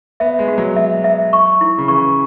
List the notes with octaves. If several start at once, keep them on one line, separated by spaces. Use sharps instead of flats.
B3 E5
G#3
F#4
F#3
F#3 E5
E5
C#6
E4
C#3
E3 C#6